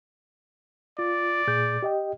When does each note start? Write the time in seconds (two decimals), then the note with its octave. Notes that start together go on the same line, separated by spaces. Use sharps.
0.99 F4 D5
1.47 A#2 G#4 G6
1.83 G4 D#5 G5